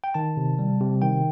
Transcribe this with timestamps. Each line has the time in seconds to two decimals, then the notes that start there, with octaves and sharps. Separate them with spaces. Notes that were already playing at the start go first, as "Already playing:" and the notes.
0.04 G5
0.14 D#3 A5
0.37 C3
0.59 G3
0.80 C3
1.02 D#3 G5